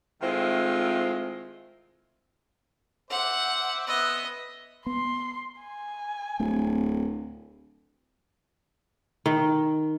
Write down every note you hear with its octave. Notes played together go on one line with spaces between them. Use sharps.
D#3 G#3 A3 C4 E4 F4
C5 E5 F#5 D6
B3 B4 D#5 E5
B3 C6
G#5
D1 D2 A3 C4
D#3